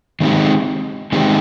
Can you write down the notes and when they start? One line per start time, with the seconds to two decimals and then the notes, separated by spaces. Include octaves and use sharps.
0.20 D#3 G#3 C4 D#4 G4
1.12 D#3 G#3 C4 D#4 G4